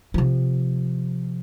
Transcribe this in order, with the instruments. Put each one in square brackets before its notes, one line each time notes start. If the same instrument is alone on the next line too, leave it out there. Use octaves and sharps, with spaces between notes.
[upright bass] C3 F3